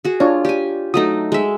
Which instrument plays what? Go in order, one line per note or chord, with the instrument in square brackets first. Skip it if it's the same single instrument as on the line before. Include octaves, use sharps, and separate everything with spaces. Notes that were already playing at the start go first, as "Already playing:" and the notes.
[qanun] F#4 G#4
[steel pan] D4 C#5 D5 [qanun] F4
[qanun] G4 G#5
[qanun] F#3 A3 D#4 [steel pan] D#6
[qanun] G#3 E5